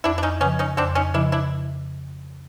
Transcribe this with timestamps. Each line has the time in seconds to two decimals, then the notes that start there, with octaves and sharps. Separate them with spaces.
0.04 F2 D4 E4
0.18 D4
0.23 C#4 D#4
0.41 C#3 B3 C#4
0.46 F3
0.59 C#4 D#4
0.77 F2 C4 D4
0.95 C#4 D#4
1.14 C#3 F3 D4 E4
1.32 D4 E4